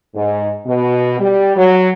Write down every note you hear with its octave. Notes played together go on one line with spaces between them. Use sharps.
G#2
B2
G3
F#3